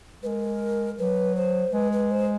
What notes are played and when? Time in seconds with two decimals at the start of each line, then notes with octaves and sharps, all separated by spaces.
0.23 G#3 A#4 B4
0.98 F#3 B4
1.36 C5
1.73 G#3 B4
1.92 B4
2.11 C5